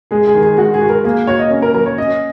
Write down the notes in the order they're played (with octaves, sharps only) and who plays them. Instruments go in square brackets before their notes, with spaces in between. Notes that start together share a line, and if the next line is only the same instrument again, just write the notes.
[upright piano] G#3 [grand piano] G#4
[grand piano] G#4
[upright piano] D#3
[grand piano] G#4
[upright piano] G#3 [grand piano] F#4
[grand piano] G#4
[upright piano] F#4
[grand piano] A#4
[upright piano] A#3 [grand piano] G#4
[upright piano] F#4 [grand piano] C#5
[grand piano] D#5
[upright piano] C#4
[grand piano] A#4
[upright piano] F#3 [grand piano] A#4
[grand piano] C#5
[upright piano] C#4 [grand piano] D#5